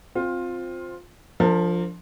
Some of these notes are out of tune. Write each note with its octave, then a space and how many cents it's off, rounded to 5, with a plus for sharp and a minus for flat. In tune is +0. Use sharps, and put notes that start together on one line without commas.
C4 +0 F4 +15
F3 +5 D4 +0 A#4 -40